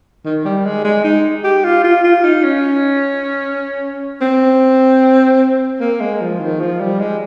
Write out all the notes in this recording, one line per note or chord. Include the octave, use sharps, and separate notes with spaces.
D#3
G3
G#3
G#3
D#4
G4
F4
F4
F4
D#4
C#4
C4
A#3
G#3
F3
D#3
F3
G3
G#3